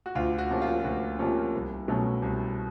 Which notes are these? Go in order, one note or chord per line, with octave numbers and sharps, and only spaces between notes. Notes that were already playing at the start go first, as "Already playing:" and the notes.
F#4
D2 F4
F#4
C3 F3 A#3 C#4
F4
D2 F#4
C3 F3 A#3 C#4
C2
B2 F#3 A3 C#4
C2